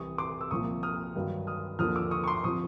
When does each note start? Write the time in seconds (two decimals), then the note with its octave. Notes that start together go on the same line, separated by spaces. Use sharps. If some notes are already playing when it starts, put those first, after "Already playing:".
Already playing: C2 C3 E3 C#6 D#6
0.18 C6 D6
0.41 E6
0.51 C2 A#2 F3 C#6 D#6
0.83 D#6 F6
1.15 G2 D#3 F#3
1.47 D#6 F6
1.79 D#2 D3 F3 D#6 F6
1.95 D6 E6
2.11 C#6 D#6
2.24 C#6
2.27 C6 D6
2.43 C3 F3 C#6 D#6